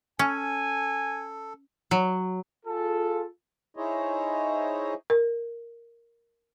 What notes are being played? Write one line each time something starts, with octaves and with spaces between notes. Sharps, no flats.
C#4 A4 G#5
F#3
F4 G#4 A4
D#4 E4 G#4 C5 C#5 D#5
A#4